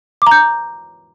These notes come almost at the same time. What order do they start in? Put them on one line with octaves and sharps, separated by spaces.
D6 A#5 G6